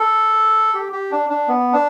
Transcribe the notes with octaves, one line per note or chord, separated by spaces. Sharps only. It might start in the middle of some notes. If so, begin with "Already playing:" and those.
Already playing: A4
G4
G4
D4
D4
B3
D4